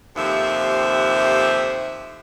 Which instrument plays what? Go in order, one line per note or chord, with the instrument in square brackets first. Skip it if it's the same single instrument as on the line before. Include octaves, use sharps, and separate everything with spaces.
[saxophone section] D#2 C3 F3 A3 E5